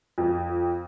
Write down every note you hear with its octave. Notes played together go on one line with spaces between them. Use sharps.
F2